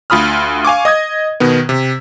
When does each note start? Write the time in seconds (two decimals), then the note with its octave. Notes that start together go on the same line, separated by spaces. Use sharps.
0.10 D2 F4 B5 D#6 F6
0.65 F5 G#5 C#6 D6
0.85 D#5 D#6 G#6
1.40 B2 D#3 B3
1.69 C3